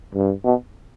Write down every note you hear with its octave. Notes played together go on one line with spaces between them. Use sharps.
G2
B2